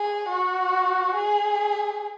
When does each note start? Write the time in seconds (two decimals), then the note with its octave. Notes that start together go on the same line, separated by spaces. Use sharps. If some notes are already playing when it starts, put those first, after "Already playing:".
Already playing: G#4
0.28 F#4
1.15 G#4